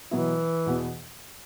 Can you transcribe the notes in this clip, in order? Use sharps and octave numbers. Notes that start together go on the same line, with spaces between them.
B2 E3 F#3 B3 E4
E2 B2 B3